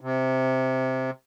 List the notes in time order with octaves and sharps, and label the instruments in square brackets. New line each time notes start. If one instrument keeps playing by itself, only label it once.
[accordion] C3